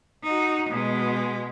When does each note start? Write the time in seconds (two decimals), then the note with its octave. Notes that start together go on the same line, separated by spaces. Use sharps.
0.23 D#4 F#4
0.69 B2 G#3